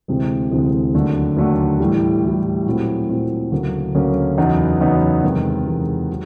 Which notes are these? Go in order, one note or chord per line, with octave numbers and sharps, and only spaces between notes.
D2 C3 E3 G#3 C4
D2 C3 E3 G#3 C4
D#2 D3 F#3 A3 D4
D#2 D3 F#3 A3 D4
A2 E3 G3
A2 E3 G3
A#2 F#3 A3 C4 E4
A#2 F#3 A3 C4 E4
D2 C#3 F#3 A#3 C#4
D2 C#3 F#3 A#3 C#4
E2 C#3 F#3 B3 D#4
E2 C#3 F#3 B3 D#4
E2 C3 D#3 G#3
E2 C3 D#3 G#3
F#3